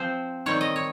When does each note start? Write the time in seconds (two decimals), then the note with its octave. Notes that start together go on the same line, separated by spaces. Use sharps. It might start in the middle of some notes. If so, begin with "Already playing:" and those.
Already playing: F3 C4 C5
0.46 D#3 G3 C4 C#5
0.61 D#5
0.76 C#5